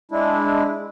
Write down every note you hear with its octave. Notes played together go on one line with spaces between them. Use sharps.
G#3 D4 E4